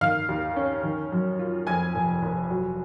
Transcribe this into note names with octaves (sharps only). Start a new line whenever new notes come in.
D#3 F5 F6
D#2
C#4
D#3
F#2
F4
F2 G#5 G#6
F1
F1
F#3